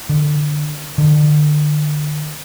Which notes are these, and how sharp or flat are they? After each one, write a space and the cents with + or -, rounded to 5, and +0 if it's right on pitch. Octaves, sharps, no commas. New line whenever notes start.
D3 +20
D3 +30